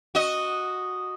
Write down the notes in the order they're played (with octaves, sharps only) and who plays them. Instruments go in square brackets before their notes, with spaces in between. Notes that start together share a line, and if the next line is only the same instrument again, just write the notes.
[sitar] F#4 D#5